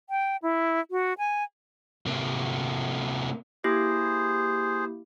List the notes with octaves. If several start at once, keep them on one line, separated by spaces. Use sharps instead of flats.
G5
E4
F#4
G#5
C3 A#3
A#3 E4 G4 G#4 C5